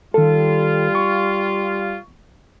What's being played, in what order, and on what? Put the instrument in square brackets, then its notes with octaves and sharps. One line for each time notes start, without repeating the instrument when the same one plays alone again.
[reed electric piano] D#3 A4 [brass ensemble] G3 F4
[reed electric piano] C#6